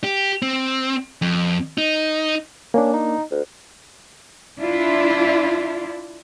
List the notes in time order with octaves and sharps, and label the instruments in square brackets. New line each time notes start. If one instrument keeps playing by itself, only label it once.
[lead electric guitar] G4
C4
F2
D#4
[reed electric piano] A#3 D4 [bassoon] C#4
[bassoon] D#4
D2
[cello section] D4 E4 F4